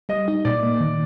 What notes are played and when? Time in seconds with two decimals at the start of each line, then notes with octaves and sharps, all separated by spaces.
0.09 G3 D#5
0.28 D#4
0.45 A#2 D5
0.63 A#3
0.81 D#3